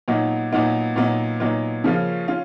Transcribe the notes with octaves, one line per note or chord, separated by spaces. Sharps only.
A#2 F#3 B3 D#4
A#2 F#3 B3 D#4
A#2 F#3 B3 D#4
A#2 F#3 B3 D#4
C#3 F3 A#3 C#4 F4
C#4 F4